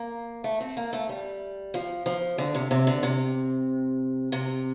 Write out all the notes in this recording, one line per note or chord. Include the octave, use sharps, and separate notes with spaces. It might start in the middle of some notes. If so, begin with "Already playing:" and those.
Already playing: A#3
A3
C4
A#3
A3
G3
F3
F3
D3
C3
C3
D3
C3
C3